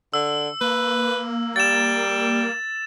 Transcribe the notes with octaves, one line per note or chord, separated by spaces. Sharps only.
D3 E6
A#3 B4
G3 A6 E7